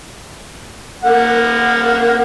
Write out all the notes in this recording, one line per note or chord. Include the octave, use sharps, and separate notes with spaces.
A#3 F#5